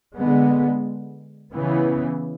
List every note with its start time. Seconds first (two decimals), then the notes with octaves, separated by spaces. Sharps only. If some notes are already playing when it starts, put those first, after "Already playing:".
0.15 D3 G#3 B3
1.54 C#3 E3 B3